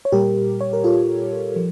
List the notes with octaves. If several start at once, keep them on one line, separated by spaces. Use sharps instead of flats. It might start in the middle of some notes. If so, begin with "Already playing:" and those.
C#5
A#2 G3 G4 A#4
C#5
A#4
F4 A4
F3